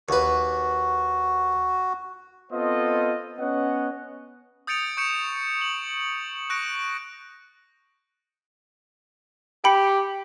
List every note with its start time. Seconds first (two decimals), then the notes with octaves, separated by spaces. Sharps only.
0.09 D#2 F#4 B4
2.52 B3 C4 F4 A4 C5 D#5
3.40 B3 C#4 C#5 D#5 F#5
4.67 D#6 G6 A6 C#7 D7 F7
4.97 C#6 G6 C#7 E7
5.61 F#7
6.50 C#6 F#6 A#6 D7
9.64 G4 G5 B5 C#7